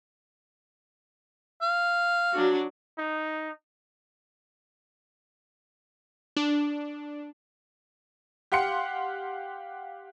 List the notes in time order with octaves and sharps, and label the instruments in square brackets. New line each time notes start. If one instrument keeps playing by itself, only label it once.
[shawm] F5
[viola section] F#3 D4 F#4
[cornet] D#4
[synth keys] D4
[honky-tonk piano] G4 F5 F#5 C6 C#7